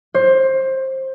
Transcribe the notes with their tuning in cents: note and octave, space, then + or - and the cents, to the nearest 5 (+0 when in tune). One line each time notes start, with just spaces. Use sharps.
C5 +20